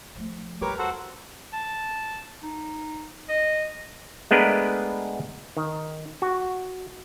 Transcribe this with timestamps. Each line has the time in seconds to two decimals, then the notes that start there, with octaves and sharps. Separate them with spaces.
0.16 F3 A3
0.61 E2 G3 G4 A#4 B4 C#5 D6
0.79 F#4 A4 C5 F#5
1.53 A5
2.43 D#4
3.29 D#5
4.31 G#3 A3 B3 D4 A#4 B4
5.57 D#3
6.22 F#4